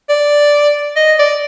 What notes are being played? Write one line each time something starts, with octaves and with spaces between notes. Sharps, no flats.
D5
D#5
D5